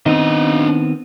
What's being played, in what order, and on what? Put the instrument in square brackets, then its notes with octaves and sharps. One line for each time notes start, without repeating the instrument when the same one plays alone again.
[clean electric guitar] D#3 B3 C4 [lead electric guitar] D4 D#5